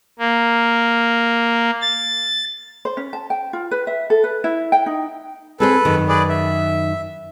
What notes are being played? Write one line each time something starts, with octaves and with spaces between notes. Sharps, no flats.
A#3
A6
C5
C#4
A5
G5
F4
B4
E5
A4
B4
E4
G5
D#4
C4 G#4 A4 B4 C5
F#2 D#3
G#4 B4 D5
E5